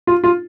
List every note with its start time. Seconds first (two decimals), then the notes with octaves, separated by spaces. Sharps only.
0.07 F4
0.24 F4